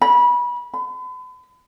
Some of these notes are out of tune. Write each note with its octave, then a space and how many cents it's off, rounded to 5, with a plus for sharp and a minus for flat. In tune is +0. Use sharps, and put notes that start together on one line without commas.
B5 -25
B5 +40